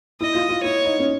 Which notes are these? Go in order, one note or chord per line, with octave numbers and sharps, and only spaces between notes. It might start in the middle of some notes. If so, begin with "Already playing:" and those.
E4 D#5
F4
F4
E4 C#5
D#4
C#4